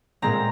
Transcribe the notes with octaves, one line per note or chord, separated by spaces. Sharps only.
A#2 G#3 C4 A#5